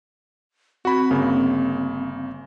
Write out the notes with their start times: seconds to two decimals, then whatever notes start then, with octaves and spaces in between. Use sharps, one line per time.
0.85 C4 F#4 B5
1.10 G1 C#3 A#3